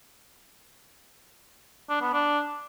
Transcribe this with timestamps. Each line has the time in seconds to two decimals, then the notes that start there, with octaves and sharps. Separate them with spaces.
1.90 D4
2.02 B3
2.14 D4